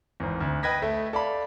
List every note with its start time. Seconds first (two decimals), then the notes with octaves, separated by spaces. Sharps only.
0.20 G#1 E2
0.41 D2
0.63 B4 D#5 G5 G#6 A#6 B6
0.82 A3 E5
1.13 A4 D5 F5 B5